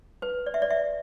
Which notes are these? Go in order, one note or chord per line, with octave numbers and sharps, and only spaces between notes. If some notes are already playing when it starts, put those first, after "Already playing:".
B4
D5
E5
D5
E5